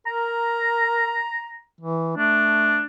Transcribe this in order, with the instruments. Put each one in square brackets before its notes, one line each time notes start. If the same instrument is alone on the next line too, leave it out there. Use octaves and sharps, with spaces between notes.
[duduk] A#4 [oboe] A#5
[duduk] E3
[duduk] A3 [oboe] D4